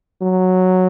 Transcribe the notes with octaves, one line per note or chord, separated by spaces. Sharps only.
F#3